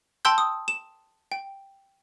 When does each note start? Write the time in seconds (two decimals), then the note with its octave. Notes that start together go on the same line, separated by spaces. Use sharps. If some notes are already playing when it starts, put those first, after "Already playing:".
0.25 G5 A5 C6 E6 G6
0.38 D#6
0.68 E7
1.32 G5